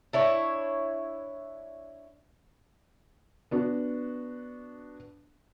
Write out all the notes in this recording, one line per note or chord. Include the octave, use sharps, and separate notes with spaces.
D4 E4 C#5
B3 D4 F#4